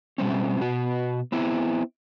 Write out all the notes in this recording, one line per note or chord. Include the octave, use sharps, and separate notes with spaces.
B2 G3 C4 C#4
B2 F#4
B3 C4 E4